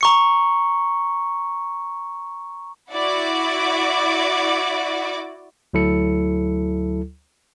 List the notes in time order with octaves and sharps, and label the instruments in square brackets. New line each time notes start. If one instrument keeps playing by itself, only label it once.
[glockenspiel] A#5 C#6 C#7
[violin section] E4 F#4 D5 D6
[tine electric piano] D2 F#3 E4 A4 C#7